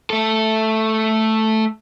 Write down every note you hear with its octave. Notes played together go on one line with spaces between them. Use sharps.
A3 A4